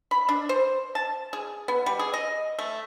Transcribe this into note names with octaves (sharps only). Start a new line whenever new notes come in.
B5
D4
C5
A5
G#4
B3
G3
G#4
D#5
A3